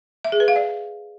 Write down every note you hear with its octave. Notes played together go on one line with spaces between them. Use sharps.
E5
G#4
B4
F5
D5